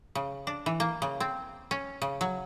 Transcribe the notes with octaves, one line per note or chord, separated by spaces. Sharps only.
C#3
D4
E3
A#3
C#3
C4
C#4
C#3
F#3